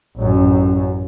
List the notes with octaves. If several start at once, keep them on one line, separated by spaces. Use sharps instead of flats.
A1 F#2